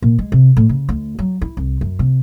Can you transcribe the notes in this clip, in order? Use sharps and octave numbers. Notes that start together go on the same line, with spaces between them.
A#2
G#3
C3
A2
C#3
D2
F#3
E4
C2
F#2
C3